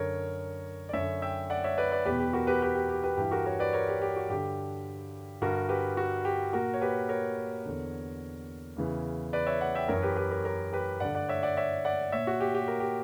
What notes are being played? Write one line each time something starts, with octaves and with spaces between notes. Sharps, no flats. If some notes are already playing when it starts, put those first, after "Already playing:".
Already playing: F#2 D3 A#4 C#5
D5
F#2 C#5 E5
D3
E5 G5
D5 F#5
C#5 E5
B4 D5
B4 D5
E2 B2 G4 B4
G4
F#4 A#4
G4 B4
G4 B4
G4
G4
G4 B4
G2 E3 G4
F#4 A#4
A#4 C#5
B4 D5
A#4 C#5
G4
G4
F#4
G2 D3 G4
G2 D3 F#4 A#4
G4 B4
F#4
G4
A#2 F#4 A#4
C#5
G4 B4
A#4 C#5
E2 D3
E2 C#3 E3
B4 D5
C#5 E5
D5 F#5
E5 G5
F#2 E3 A#4 C#5
G4 B4
G4 B4
A#4 C#5
A#4 C#5
G4 B4
G2 D3 D5 F#5
D5 F#5
C#5 E5
D5 F#5
C#5 E5
D5 F#5
A#2 C#5 E5
F#4
G4
G4
A#4
G4